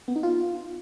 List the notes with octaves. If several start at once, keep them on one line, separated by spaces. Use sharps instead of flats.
B3
D#4
F4